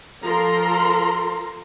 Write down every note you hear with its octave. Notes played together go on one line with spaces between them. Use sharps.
F3 A4 A#4 A#5 C6